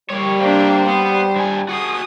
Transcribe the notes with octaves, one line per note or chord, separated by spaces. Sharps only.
G3 A#3 C#5
A#3 C4 D4 G4
B3 C5
G2 G#5
F#4 G#4 D#6